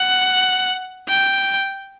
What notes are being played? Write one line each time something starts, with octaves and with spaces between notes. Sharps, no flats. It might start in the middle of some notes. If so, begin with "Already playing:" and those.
Already playing: F#5
G5